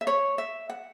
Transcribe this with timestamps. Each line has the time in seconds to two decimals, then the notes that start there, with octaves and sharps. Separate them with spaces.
0.01 E5
0.07 C#5
0.38 E5
0.69 F#5